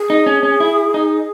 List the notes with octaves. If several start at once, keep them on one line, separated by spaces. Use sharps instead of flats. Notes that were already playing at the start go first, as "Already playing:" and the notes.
Already playing: G#4
D#4
C#4
C#4
E4
D#4